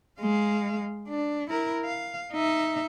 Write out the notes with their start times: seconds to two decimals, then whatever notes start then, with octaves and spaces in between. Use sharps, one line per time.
0.21 G#3 F5
1.08 D4
1.50 E4 A#4
1.84 F5
2.32 D#4 E5